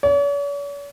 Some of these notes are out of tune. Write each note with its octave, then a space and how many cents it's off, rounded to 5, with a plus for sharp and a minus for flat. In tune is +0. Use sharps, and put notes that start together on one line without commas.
C#5 +45